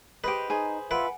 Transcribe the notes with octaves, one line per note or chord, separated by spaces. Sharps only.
G4 G#4 B4 C5 D#5 B6 D7
D#4 G#4 C5 G#5
F4 B4 E5 F#5 D7